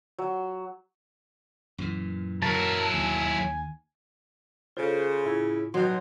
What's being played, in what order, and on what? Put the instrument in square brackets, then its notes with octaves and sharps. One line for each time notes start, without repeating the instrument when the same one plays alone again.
[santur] F#3
[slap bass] F#2 A#2 E3
[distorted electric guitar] F#3 E4 [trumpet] A#4 [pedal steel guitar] A5
[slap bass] D#2 [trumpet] G#5
[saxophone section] C#3 [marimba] F4 A4 C#5 [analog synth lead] C5
[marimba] A2 F4 G#6 [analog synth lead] E4
[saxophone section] B2 G3 D#4 [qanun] F#3 [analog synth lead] C6